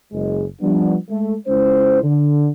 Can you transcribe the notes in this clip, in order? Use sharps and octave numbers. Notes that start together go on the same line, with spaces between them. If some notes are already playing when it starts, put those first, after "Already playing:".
F#1 G#3
F3 G3 B3 D4
G#3 A3
C#2 G#3 C#4 E4 C5
D3